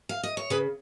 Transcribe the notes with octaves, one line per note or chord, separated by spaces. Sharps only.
F5
D#5
C#5
C#3 G#4 B4